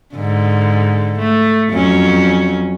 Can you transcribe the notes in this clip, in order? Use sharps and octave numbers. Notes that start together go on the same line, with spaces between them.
G#2 D3
A3
F2 F#3 C#4